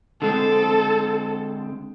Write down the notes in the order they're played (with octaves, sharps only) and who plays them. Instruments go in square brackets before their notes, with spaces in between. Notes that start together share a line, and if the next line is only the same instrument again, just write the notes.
[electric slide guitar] D3 G#3 C4 [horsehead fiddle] A4